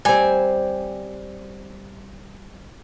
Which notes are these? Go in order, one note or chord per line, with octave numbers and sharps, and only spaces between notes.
G3 C4 G#5